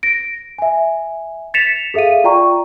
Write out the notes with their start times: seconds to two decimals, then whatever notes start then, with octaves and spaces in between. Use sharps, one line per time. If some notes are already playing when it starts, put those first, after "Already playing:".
0.03 A#6 D7
0.58 E5 G#5
1.54 A6 B6 C#7 E7 F7
1.94 G#4 A4 E5 F5 D#7
2.24 F4 D5 G5 A#5 C#6